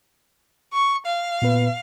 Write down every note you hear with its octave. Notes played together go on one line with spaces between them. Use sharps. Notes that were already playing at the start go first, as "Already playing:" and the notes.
C#6
F5
A#2 B3 B4